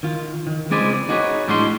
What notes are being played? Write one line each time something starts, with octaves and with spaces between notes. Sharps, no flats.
D#3 F4
D#3
C#2 G#3 C4 D5 G#5 B5
D5
D#4 F#4 G#4 A#4 B4 C#5
A2 G3 G#3 D4 F#4 C6